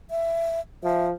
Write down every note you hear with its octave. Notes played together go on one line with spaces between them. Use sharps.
E5
F3 E5